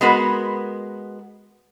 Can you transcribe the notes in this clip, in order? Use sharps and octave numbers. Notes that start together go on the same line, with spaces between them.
G#3 B3 F#4 A#4